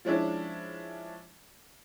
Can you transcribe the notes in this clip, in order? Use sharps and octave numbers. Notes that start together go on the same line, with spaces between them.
F3 G#3 C#4 D4 E4